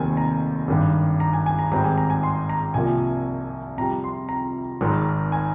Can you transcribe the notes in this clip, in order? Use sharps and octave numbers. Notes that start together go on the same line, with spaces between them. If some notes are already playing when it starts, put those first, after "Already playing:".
Already playing: F1 D#2 D#3 G3 C4 G#5
A#5
G#1 G2 D#3
A#5
G#5
G#5
A#5
G#1 G#2 G3 C4 A#5
G#5
A#5
G#5
C6
A#5
C2 C3 F3 A#3 G#5
F2 C3 G3 A#5
C6
A#5
G#1 G#2 D#3
G#5